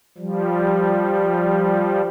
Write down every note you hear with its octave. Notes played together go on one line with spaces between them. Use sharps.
F3 G3